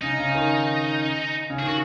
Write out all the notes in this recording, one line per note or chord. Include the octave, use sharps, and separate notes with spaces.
C#3 D#4
C#3
C#3
D#3
C#3
D#3 G#4
F#4